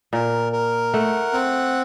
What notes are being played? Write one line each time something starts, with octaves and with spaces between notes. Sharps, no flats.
A#2 A#4
A#4
A3 F#5
C4